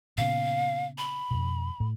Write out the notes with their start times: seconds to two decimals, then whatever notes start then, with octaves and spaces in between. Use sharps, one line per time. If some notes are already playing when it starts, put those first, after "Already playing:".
0.18 A#2 C#3 B3 F5
0.98 B5
1.31 F2 B2
1.80 A2